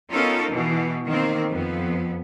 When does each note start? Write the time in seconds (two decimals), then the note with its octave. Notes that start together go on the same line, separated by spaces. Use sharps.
0.12 B3 C#4 D#4 F4 A4 A#4
0.51 B2 E3
1.06 D#3 A#3 C4
1.50 F2 B3